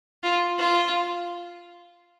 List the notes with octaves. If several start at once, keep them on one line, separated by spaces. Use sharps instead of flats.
F4
F4